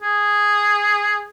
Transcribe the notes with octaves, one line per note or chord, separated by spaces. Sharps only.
G#4